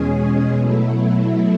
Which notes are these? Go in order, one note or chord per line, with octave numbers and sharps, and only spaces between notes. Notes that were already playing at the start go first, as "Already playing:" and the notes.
Already playing: E2 B2 G#3 C#4 G#4
B2 F#3 A3 E4